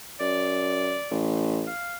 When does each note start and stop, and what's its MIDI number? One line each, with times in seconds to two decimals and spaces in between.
0.20 0.98 42
0.20 1.25 74
1.11 1.70 33
1.67 1.97 77